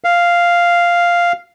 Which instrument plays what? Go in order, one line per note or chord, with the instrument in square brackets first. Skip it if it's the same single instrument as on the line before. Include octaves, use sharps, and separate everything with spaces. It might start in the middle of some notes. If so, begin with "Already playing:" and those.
[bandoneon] F5